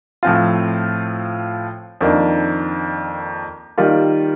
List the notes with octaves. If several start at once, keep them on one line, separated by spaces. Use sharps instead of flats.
A2 F3 C4 F4
F2 D#3 A#3 D4
D#3 G3 A#3 F4